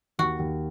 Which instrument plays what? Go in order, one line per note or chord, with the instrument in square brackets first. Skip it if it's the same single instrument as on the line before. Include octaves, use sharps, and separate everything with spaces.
[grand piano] D#2 [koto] F#4
[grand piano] D#2